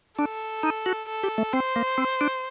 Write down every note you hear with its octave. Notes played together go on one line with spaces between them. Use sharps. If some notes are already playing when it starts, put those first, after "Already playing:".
D4 A4
D#4
F#4
A4
G4
A3
C4 C5
A#3
C4
D4